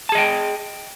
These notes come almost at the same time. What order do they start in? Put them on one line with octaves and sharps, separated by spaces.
A5 G#4 D#5 G5